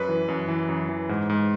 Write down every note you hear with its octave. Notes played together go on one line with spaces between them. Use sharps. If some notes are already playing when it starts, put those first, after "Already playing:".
Already playing: F#2 B4
E3
F#2
E3
F#2
E3
G#2
G#2